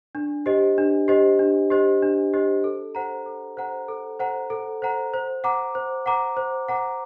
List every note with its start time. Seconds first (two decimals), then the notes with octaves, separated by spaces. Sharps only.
0.15 D4
0.46 G4 C5 D#5
0.78 D4
1.08 G4 C5 D#5
1.39 D4
1.70 G4 C5 D#5
2.02 D4
2.34 G4 C5 D#5
2.64 A4
2.95 C5 F#5 A#5
3.26 A4
3.57 C5 F#5 A#5
3.88 A4
4.20 C5 F#5 A#5
4.50 A4
4.82 C5 F#5 A#5
5.14 C5
5.44 F#5 A#5 D6
5.75 C5
6.06 F#5 A#5 D6
6.37 C5
6.68 F#5 A#5 D6